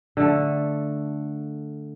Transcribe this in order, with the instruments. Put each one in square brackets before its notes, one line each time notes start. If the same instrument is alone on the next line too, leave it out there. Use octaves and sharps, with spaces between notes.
[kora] D3 A3